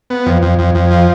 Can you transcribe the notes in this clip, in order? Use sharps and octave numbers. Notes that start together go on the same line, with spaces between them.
B3
F2
F2
F2
F2
F3